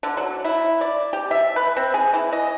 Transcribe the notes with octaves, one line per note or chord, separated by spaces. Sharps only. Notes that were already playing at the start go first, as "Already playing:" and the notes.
D3
F#3
E4
D5
G4
E5
B4
C4
G#4
E3
D#5